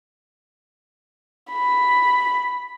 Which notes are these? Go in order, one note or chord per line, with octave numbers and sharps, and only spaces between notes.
B5